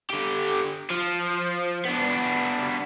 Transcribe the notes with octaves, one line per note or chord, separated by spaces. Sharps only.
D3 G4
F3
B3 D4